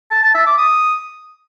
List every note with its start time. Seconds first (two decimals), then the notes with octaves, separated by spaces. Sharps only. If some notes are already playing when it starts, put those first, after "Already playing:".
0.11 A5
0.23 A5
0.35 E5
0.46 D6
0.58 D#6